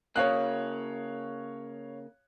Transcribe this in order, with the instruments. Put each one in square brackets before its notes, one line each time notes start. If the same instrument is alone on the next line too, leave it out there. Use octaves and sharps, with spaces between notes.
[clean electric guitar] C#3 A#3 [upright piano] C#5 F5 F#6